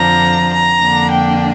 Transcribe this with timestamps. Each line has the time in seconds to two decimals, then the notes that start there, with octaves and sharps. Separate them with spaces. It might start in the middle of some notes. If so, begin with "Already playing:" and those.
Already playing: F2 D3 F3 D4 A#5
0.53 A#5
0.82 F2 D3 A#3 D4
1.11 G5